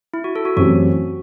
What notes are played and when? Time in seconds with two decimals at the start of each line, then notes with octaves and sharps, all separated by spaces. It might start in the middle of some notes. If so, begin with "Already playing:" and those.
0.14 E4
0.24 F#4
0.35 A4
0.45 F#4
0.57 F#2 E3 A3 C4 F#4 G4